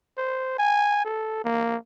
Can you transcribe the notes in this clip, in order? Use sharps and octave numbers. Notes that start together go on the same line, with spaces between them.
C5
G#5
A4
A#3